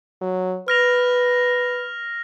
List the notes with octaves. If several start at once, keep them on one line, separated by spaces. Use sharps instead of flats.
F#3
B4 F6 A#6 F7